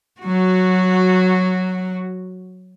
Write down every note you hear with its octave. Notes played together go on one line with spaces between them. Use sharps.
F#3 F#4